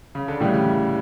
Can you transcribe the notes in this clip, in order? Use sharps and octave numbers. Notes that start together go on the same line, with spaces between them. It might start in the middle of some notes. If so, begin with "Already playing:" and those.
C#3
D3
A2 C#3 E3 G3